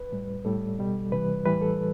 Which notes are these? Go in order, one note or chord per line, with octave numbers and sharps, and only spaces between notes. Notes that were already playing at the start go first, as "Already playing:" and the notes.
Already playing: B4
A2 G3
A2 G3 A4
B2 G3
C3 E3 G3 B4
A2 E3 G3 B4
A4